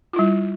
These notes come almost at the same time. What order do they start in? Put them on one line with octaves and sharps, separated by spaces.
F4 E4 G3